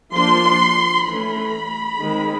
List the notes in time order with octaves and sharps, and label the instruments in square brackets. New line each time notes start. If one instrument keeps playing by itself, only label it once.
[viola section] F3 A#3 D4 C6
E3 A3 C#4 B5
D#3 G#3 C4